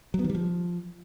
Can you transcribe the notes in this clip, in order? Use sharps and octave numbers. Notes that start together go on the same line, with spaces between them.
F#3
B3
D#3
G3
F3